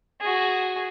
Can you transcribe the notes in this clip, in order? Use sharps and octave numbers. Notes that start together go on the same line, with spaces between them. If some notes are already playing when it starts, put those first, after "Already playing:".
F#4 G#4